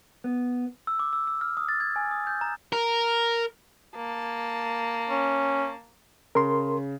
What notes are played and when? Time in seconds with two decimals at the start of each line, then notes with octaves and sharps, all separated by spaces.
0.24 B3
0.87 E6
0.99 D6
1.13 E6
1.27 E6
1.41 F6
1.57 D#6
1.69 A6
1.80 G#6
1.96 G#5
2.11 D#6
2.27 G6
2.41 A#5
2.73 A#4
3.96 A#3 A5
5.10 C#4
6.35 C#3 A#4 C6